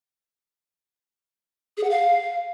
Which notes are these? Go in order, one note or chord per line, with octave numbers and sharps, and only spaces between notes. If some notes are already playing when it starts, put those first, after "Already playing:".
G#4
F#5
F5